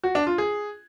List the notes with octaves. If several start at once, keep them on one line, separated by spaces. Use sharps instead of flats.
F#4
D4
F4
G#4